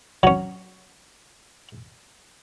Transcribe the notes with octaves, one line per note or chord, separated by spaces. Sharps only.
F#3 C#4